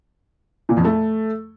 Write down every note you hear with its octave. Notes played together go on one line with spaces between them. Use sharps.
A#2
F2
A3